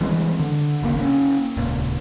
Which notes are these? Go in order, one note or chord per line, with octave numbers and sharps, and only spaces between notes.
E3 G3 G#3 C4
D3
D#1 G#1 C#3 A#3
A#3 B3 C#4
D#1 C#2 A#2